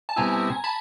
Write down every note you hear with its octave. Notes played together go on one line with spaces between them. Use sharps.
A5
B2 G3 C4 E4 G#5 A#5
A5 B5